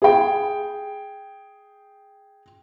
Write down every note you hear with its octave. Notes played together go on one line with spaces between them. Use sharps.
G#4 G5